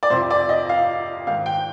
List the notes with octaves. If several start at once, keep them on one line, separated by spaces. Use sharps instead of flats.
D5
F2 C3 F3 C5
D5
D#5
F5
G#2 D#3 F5
G5